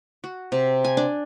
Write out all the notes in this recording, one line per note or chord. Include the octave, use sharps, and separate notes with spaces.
F#4
C3
G#5
D4